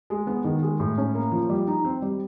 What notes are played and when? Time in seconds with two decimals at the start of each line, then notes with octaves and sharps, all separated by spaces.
0.10 G#3
0.27 B3
0.44 D#3
0.62 G#3
0.80 A2
0.98 C#4
1.15 A#3
1.32 F3
1.49 G3
1.67 D#4
1.85 C4
2.02 G3